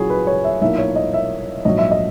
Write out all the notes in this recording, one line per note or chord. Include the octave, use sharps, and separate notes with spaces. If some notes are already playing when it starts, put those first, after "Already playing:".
Already playing: A#2 F#3 C#4 E4 F#4 G#4
B4
C#5
E5
B1 A#2 A#3 E4 E5
C#5
D#5
E5
A#1 G#2 F#3 D#5
E5
D#5